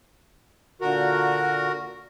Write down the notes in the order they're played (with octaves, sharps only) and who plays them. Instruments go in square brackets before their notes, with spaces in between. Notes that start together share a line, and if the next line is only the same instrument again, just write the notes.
[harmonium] A#2 D3 [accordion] F#4 A#4